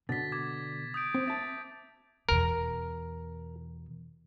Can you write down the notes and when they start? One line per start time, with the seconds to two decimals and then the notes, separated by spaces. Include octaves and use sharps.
0.09 B2 D3 A6 B6
0.32 D6 G#6
0.94 D#6 G6 D7
1.15 C4
1.27 E5 A5 A6
2.29 E2 B2 A#4